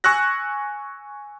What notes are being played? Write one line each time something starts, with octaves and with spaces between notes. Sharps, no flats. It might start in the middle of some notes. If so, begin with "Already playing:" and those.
G#5 C#6 E6 F#6 A#6